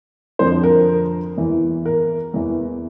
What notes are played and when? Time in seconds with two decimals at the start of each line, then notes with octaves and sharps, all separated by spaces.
0.39 F2 D3 F3 C5
0.63 A#4
1.37 E2 E3
1.86 A#4
2.34 E2 E3